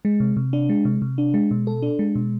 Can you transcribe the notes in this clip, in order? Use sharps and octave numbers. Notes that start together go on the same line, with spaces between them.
G#3
C3
C3
D4
G#3
C3
C3
D4
G#3
B2
A4
D4
G#3
B2